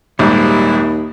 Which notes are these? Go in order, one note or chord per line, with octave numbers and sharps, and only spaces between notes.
A#1 D#2 G#2 G3 E4